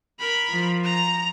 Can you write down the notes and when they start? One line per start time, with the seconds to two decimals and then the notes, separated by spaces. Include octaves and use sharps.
0.19 A#4 B5
0.49 F3
0.84 A#5